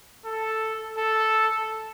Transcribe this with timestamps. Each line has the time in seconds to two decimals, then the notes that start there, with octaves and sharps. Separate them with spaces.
0.25 A4
0.97 A4